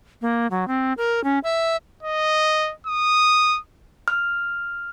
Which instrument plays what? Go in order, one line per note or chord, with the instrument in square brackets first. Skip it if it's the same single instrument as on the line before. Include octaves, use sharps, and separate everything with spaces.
[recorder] A#3
F#3
C4
A#4
C#4
E5
[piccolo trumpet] D#5
D#6
[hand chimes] F6